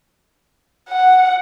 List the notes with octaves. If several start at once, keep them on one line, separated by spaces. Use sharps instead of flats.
F#5